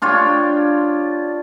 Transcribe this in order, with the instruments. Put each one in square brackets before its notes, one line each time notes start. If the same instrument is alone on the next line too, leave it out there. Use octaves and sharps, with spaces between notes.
[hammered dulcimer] D4 F4 G4 C#5